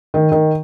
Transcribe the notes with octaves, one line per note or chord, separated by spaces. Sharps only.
D#3
D#3